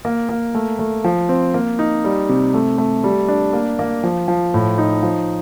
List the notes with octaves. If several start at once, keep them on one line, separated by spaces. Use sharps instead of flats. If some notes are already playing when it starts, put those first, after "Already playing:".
A#3
A#3
A3
A3
F3
C4
A#3
D#4
G3
C3
A3
A3
G3
D4
A#3
A#3
F3
F3
A2
D#4
F3